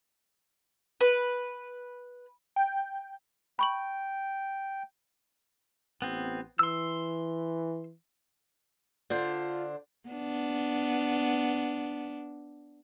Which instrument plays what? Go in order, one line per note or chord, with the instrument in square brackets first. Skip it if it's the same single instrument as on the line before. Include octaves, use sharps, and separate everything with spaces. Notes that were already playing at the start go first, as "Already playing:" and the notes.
[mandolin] B4
[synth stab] G5
[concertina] G5 [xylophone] B5 C#6 F#7
[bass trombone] A1 [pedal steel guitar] B3 C4
[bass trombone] E3 [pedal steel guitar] C6 E6
[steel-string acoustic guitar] D3 D4 C5 [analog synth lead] F4
[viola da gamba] B3 D4